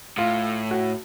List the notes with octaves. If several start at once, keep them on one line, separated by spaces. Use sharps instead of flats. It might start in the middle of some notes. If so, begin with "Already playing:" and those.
A2 F4
F#4